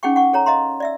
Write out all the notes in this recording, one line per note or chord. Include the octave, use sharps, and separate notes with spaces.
C#4 D#4 G#4 F#5 G5 C#6
F#5 C#6
A4 C#5 A#5
D#5 F5 A#5 C6
D5 E5 E6